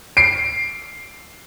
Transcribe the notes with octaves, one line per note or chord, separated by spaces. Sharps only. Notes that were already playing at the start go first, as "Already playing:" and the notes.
C7 D7